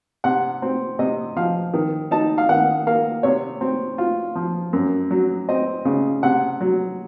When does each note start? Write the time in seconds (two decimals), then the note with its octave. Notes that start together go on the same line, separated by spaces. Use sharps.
0.24 C3 F#5
0.62 C4
0.99 C3 D#5
1.36 F3 F5
1.74 D#3
2.11 D#4 A5
2.38 F5
2.49 D#3 F#5
2.87 A#3 F5
3.23 C3 C#5
3.61 C4
3.98 F4
4.35 F3
4.73 F#2
5.11 F#3
5.49 C4 D#5
5.85 C#3
6.23 C3 F#5
6.61 F#3